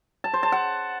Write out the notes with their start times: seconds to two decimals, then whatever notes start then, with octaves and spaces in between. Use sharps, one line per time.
0.24 A5
0.33 C5
0.43 A5
0.52 F#5